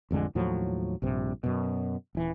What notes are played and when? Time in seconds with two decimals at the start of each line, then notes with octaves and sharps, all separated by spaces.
0.11 A1 F2 D3 G#3
0.35 D#2 A2 F3 F#3
1.02 A#1 G2 C3
1.43 F#2 B2
2.15 D#1 E3